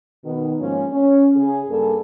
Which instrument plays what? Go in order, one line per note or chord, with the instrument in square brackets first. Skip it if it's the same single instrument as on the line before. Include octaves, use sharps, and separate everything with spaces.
[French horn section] B2 D#3 B3
G#2 F3 A#3 C#4
C#4
C#3 G#4
G2 G3 A#3 G#4 A4